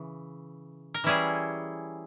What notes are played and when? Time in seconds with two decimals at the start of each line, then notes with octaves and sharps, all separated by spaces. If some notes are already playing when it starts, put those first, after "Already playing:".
Already playing: C#3 E3
0.94 A#4
1.04 E3 G3 C#4 E4 G#4